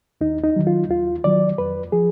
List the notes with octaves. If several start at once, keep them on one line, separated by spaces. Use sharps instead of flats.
D#2 D#4
D#4
D#3 F#3
F4
D#2 F4
D#3 F#3 D5
F2 B4
F3 G#4